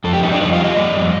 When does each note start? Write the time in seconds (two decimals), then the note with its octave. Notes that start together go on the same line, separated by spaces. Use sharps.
0.04 F2 A4
0.13 G4
0.22 G3 D#4
0.32 D4
0.40 F2 D#4
0.53 F4
0.58 G3
0.64 D#5
0.77 G3
0.95 F2